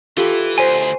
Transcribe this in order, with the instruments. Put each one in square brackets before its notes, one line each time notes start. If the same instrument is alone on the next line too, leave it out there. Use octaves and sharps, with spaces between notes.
[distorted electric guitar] E3 [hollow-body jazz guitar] F4 G4 A4
[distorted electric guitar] D2 [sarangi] C5 [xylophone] G#5